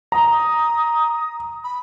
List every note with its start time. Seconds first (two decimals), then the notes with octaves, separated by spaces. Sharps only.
0.12 A#5 D#6
1.64 B5